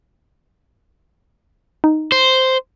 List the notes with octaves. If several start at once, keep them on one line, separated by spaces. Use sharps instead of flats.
D#4
C5